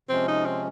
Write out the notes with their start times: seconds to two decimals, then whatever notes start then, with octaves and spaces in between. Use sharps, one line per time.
0.09 C3 F3 G#3 C4 C#4
0.28 D#4
0.45 C4